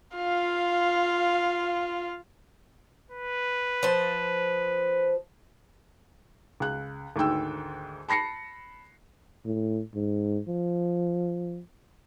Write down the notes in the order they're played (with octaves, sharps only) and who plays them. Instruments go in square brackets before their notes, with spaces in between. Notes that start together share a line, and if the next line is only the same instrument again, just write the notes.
[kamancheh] F4 F5
[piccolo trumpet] B4
[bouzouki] F3 C5
[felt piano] C#2 F#6
D2 G#2 D#3 G5 E6
A5 B5 A#6 C7 C#7
[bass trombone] A2
G#2
F3